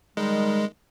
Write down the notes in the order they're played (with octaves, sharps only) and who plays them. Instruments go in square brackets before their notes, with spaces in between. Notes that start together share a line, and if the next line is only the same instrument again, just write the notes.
[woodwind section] D#3 G3 [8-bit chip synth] G#3